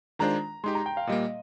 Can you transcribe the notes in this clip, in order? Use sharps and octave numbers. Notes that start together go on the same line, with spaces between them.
D#3 G#3 D4 F4 C5 A#5
G#3 D#4 G4 C6
A#5
G5
F5
A#2 G3 A#3 D#5